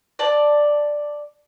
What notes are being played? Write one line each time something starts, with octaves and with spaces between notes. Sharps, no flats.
D5 A5